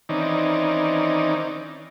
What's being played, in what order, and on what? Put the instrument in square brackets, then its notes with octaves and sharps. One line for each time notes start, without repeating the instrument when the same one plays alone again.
[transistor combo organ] D#3 E3 C4 C#4 D#4 D5